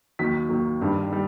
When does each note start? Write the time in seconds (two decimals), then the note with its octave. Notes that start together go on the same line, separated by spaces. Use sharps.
0.19 D#2 D#3 F#3 B6
0.49 D#2 D#3 F#3
0.79 G1 G2 D#3 G3
1.12 D#3 G3